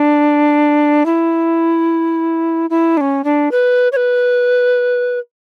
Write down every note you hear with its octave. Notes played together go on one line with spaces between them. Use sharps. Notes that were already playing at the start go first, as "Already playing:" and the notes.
Already playing: D4
E4
E4
D4
C#4
D4
B4
C#5
B4